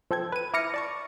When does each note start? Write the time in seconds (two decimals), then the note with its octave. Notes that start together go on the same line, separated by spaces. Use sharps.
0.11 F3 A4 G5 G#6
0.32 B4 D#7
0.54 E4 D6 F6 A#6 C#7
0.74 D5 A5 C#6